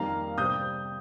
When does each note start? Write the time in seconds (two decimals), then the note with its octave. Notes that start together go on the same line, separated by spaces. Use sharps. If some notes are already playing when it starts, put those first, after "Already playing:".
Already playing: F2 D#3 G3 A#3 F5 A#5
0.37 C3 G3 C4 D#6 G6